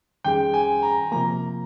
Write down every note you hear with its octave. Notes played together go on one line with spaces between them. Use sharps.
F2 D#3 G3 C#4 G#4 G5
G#5
A#5
C3 F3 A#3 A#5